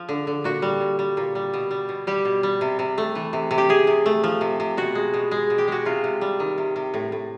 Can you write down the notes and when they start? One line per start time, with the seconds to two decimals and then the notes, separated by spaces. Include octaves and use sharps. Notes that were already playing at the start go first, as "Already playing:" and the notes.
Already playing: F3
0.09 D3
0.27 D3
0.44 A#2 F#4
0.62 G3
0.81 A#2
0.99 G3
1.17 A#2
1.35 G3
1.54 B2
1.71 G3
1.89 B2
2.07 G3 G4
2.25 B2
2.43 G3
2.61 C3
2.79 C3
2.98 A3
3.15 E3
3.33 C3
3.51 C3
3.58 G4
3.69 C3 G#4
3.87 C3
4.06 A3
4.24 F3
4.41 C3
4.60 C3
4.77 B2 F#4
4.95 G#3
5.14 B2
5.31 G#3
5.50 B2
5.58 G4
5.68 G#3 F#4
5.85 C3 F4
6.04 C3
6.21 G3
6.40 D#3
6.58 C3
6.76 C3
6.94 A2
7.12 A2